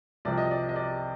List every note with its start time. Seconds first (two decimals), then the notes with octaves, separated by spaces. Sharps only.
0.25 C2 C3 F3 D5
0.38 D#5
0.51 D5
0.69 D#5
0.76 D5